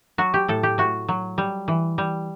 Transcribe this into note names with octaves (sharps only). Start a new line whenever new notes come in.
F#3 F#4
G4
A2 A4
G4
A2 F#4
F#3
G3
E3
G3